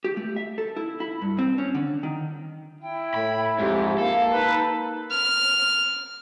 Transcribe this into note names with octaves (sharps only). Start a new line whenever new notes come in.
G4
A3
E5
A4
E4
E4
G2
C4
C#4
D3
D#3
E4 G5
A2 B5
F2 G#2 G4
A#3 A4 F5
D#4 B4
F6